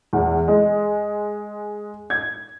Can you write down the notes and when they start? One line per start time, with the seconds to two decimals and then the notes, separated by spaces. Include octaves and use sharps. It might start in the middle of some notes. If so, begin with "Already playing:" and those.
0.13 E2
0.48 G#3
2.10 G#6